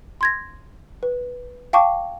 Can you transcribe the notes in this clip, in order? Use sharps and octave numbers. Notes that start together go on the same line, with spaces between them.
C6 G#6 A#6
B4
F5 G5 A5 C#6 D6